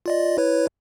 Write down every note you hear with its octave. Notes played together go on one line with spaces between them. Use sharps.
F4 D5 D#5
E4 B4 C#5